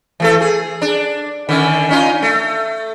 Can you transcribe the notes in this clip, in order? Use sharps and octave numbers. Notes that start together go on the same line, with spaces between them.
E3 A3 A4
G#4
D4
D3 D#3 C#4
C#4 D#4 F4
A3